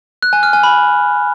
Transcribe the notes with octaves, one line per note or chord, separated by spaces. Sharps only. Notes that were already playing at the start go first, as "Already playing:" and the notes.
F#6
G#5
F6
G#5
B5